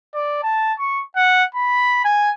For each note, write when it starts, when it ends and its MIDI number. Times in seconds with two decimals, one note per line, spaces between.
0.14 0.41 74
0.43 0.73 81
0.79 1.03 85
1.16 1.44 78
1.55 2.04 83
2.04 2.31 80